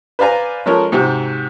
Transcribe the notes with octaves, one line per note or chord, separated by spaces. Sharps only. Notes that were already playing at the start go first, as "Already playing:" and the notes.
B4 C5 D5 F5 G#5 A#5
F3 G#3 C#4 A4 A#4 C#5
G#2 C3 C4 F#4